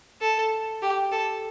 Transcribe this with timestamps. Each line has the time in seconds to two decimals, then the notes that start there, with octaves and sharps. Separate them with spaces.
0.21 A4
0.82 G4
1.12 A4